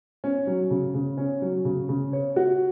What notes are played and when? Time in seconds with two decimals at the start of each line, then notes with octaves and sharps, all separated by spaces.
0.24 C#4
0.47 F#3
0.70 C#3
0.94 C#3
1.17 C#4
1.42 F#3
1.65 C#3
1.89 C#3
2.13 C#5
2.36 F#4